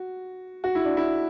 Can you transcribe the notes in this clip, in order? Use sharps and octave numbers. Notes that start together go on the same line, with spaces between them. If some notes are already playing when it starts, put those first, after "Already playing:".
Already playing: F#4
F#4
E4
D4
E4